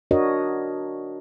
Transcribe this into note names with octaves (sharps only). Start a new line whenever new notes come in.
D4 F#4 A#4 C#5 D#5